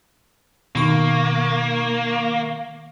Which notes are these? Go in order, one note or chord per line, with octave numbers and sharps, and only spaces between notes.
B2 D#3 A#3 C#6